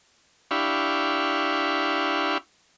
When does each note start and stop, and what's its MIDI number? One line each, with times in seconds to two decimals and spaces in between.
0.51 2.38 62
0.51 2.38 64
0.51 2.38 67
0.51 2.38 77
0.51 2.38 83
0.51 2.38 85